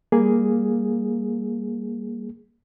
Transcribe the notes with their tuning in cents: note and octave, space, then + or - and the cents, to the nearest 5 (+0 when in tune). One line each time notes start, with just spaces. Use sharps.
G3 +15 A#3 +0 G#4 +0